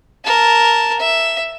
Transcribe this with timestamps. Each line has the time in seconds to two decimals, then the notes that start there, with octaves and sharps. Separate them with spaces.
0.24 A#4 A5
1.00 E5